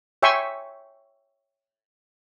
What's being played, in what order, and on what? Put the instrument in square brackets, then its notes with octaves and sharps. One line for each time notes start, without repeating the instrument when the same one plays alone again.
[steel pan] C#5 E5 G5 G#5 C6 C#6